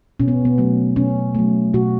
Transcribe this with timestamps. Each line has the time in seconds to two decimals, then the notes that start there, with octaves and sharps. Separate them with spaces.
0.20 B2 C#4
0.28 B3
0.45 B3
0.58 F#3 A3
0.96 B2 C#4
1.35 F#3 A3
1.74 B2 F#4